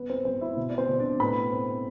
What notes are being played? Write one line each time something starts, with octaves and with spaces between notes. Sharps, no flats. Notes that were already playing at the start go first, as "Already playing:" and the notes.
Already playing: B3 B4
C4 C5
B3 C4 C5
E4 E5
B2
D5
C4 C5
B2
D4 D5
A2 B4 B5
C4